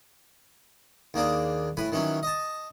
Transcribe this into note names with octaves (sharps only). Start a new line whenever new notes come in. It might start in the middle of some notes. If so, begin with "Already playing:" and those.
D#2 A#3 D4 G#4
A2 B4 G#5
D#3 E3 F#3 C#4
D#5 A5